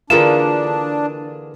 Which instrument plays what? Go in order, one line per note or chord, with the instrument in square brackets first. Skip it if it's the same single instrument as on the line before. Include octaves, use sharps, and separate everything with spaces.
[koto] D3 E3 A#3 [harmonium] D4 [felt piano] F4 G#4 A#4 [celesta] E7